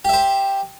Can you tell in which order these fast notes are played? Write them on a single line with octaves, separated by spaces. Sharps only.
G4 E5 C5